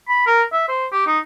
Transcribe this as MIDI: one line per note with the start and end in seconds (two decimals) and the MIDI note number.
0.08 0.24 83
0.27 0.42 70
0.53 0.66 76
0.68 0.86 72
0.92 1.02 67
1.07 1.18 63